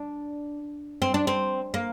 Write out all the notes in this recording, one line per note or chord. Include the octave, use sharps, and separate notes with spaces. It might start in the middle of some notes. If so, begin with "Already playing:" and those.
Already playing: D4
C4
D4
C4
A#3